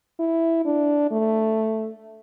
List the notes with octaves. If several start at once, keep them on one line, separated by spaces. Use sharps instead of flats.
E4
D4
A3